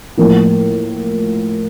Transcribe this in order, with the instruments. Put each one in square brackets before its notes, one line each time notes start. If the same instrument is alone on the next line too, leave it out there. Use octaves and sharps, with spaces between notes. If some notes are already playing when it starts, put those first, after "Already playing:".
[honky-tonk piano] A2 F3 A#3